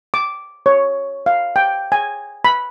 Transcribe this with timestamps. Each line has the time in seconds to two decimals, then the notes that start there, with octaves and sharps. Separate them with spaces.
0.14 D6
0.66 C#5
1.26 F5
1.56 G5
1.92 G#5
2.45 B5